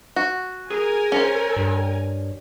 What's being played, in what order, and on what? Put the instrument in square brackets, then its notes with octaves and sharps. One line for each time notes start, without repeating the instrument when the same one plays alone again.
[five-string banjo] F#4
[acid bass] G#4 [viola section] A#4 G#5
[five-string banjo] C#4 C5
[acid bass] G2